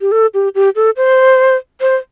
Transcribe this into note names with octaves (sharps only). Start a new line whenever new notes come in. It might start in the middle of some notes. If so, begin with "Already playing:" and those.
G4
A4
G4
G4
A4
C5
C5